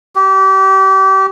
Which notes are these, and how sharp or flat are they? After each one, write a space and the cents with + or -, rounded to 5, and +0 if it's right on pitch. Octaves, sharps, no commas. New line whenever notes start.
G4 -30